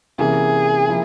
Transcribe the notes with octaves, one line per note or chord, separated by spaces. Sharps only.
C3 E3 A#3 C#4 E4 G#4
F3 A#3 E4